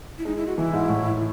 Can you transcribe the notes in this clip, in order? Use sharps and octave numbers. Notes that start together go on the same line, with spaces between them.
E4
G#3 D#4
E4
F#4
E3 E4
G#2
A2